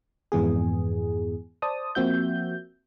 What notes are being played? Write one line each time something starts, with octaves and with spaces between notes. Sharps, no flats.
F2 G#2 E3 B3 G#4
C5 D5 A5 D#6
F3 A#3 C4 F#4 E5 G6